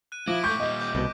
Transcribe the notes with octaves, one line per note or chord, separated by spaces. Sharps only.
F#6 D#7
F3 E4 D6 A#6 D7
G#2 A3 C#6 D6 G6 B6
A#2 G3 D#5
D6 G6
C2 B2